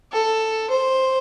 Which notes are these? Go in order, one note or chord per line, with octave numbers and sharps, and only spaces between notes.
A4
C5